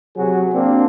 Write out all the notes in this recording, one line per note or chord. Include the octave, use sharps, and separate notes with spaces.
C3 F#3 F#4 G#4
A#3 C4 D4